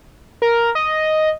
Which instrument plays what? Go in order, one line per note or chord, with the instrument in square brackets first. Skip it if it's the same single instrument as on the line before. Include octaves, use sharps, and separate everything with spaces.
[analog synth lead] A#4
D#5